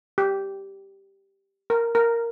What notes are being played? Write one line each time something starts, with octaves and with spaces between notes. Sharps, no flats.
G4
A#4
A#4